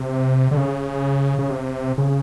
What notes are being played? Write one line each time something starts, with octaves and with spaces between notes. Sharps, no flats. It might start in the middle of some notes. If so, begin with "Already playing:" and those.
Already playing: C3
D3
C#3
C#3
C3
C#3